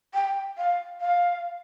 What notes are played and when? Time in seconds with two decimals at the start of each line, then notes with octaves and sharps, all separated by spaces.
0.14 G5
0.58 F5
1.01 F5